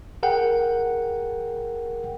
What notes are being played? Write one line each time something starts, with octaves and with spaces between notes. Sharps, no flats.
G#4 A#4 F#5 G5